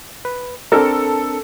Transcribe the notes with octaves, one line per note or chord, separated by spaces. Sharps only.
B4
C4 D4 A4 A#4